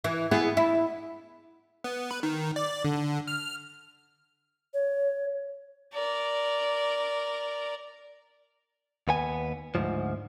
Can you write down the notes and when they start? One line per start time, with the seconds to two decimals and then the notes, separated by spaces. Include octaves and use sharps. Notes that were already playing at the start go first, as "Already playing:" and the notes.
0.04 E3
0.31 B3 E4 G#4
0.57 E4
1.84 B3
2.11 B4
2.23 D#3
2.56 D5
2.85 D3
3.27 F6
4.74 C#5
5.93 A#4 D5
9.08 D#2 B3 G#5
9.75 D2 G#2 F3